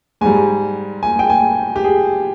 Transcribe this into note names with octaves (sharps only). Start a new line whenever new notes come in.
G#2 G3 G#5
G#5
G5
G#5
G4
G#4